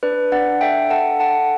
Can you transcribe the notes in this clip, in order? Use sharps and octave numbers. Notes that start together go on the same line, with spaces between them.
D4 B4 D5
D4 D5 F#5
A4 E5 G5
A4 F#5 A5
A4 F#5 A5